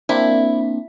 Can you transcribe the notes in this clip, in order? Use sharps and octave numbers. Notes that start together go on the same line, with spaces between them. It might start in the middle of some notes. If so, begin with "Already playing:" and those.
A#3 C4 D4 E4